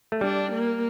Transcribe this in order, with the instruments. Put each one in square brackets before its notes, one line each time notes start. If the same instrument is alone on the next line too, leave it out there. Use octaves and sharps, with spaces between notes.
[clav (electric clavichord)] A3
[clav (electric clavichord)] G3 [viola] D4
[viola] A#3